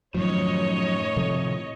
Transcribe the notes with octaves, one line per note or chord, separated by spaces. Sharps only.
F#2 A2 D#3 F3 C#5 D#5
C3 F3 A3